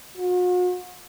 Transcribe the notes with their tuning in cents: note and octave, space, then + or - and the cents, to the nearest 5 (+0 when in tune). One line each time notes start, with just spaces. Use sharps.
F#4 -45